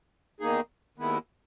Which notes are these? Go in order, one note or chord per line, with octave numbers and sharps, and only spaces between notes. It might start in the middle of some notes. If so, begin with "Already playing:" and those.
E2 D#3 A#3 D#4 G#4
D#2 D#3 G#3 B3 E4